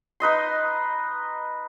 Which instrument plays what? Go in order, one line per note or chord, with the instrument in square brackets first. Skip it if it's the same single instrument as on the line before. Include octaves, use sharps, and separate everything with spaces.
[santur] D#4 B4 D#5 C6